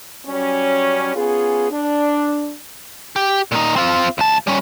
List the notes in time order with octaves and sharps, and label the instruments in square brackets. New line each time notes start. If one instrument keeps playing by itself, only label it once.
[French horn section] F#3 G3 C#4
B3 C#4 F4 G#4
D4
[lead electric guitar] G4
A#2 D#4
C4 F4
C#2 A5
G3 C#4